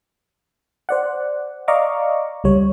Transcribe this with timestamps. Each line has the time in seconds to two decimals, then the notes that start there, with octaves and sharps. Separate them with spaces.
0.89 C5 D5 F#5
1.68 D5 D#5 F5 A#5 C#6 D6
2.44 C#2 G3 C#5